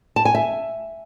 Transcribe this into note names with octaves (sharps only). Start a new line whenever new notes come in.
A5
G#5
E5